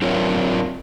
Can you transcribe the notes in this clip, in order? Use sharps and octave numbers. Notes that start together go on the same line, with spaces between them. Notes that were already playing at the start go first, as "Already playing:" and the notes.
F#3 C4 D4 F4 A#4 C#5